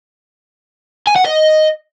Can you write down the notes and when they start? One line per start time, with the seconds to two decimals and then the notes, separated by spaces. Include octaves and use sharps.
1.07 G#5
1.16 F#5
1.24 D#5